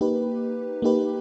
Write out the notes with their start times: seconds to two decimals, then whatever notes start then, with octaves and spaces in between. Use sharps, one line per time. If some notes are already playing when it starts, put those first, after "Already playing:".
0.01 A#3 D#4 G4 B4
0.82 A#3 D#4 G4 B4